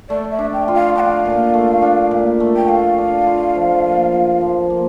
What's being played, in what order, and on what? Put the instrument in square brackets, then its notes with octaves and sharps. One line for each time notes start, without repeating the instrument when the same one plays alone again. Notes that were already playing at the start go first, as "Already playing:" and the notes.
[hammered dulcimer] A3 [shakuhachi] D5
[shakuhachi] E5
[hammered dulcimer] D4
[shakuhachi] G5
[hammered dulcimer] F4
[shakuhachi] F5
[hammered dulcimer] D4 [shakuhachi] G5
[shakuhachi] F5
[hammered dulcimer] A#2
A3
D4
A#2
A3
[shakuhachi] G5
[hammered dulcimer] A3 [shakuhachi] F5
[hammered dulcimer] D4
F4
F3
A#3
F4
F3
A#3